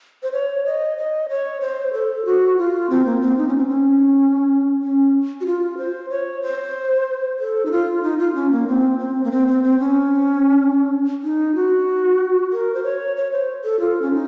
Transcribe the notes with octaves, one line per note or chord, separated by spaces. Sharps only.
C5
C#5
D#5
D#5
C#5
C5
A4
F#4
F4
C4
A#3
C4
D#4
C#4
C4
C#4
C#4
F#4
F4
C5
C#5
C5
A4
D#4
F4
D#4
F4
C#4
A#3
C4
C4
A#3
C4
C4
C4
C#4
D#4
F#4
A#4
C5
C#5
C#5
C5
A4
F4
C#4
D#4